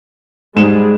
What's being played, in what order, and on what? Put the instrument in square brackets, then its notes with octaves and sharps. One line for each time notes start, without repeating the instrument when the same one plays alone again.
[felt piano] G#2 E7 [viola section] G3 G#3 G#4